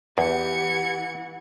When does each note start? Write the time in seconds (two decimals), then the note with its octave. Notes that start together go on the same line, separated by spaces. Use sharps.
0.18 E2 E3 G4 F#5 G#6 C#7